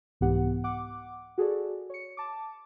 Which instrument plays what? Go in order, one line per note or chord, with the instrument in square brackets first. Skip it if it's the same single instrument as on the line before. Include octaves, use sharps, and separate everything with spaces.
[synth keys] C2 G#2 E3 B3 G4 F#5
F#5 D6
F#4 G#4 A4 D5
C#5 C#7
A5 D6